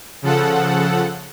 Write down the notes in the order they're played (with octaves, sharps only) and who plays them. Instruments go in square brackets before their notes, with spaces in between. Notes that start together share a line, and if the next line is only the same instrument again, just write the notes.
[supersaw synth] C#3 F3 A4 F#5